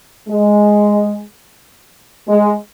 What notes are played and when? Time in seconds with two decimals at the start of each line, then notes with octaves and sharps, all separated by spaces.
0.29 G#3
2.28 G#3